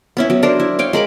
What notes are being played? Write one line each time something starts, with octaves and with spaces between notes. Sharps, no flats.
B3 C#4 E4
F#3
D4 A#4 C5 D5
E4
C#5 F5 G5
G#3 A#4 B5 D6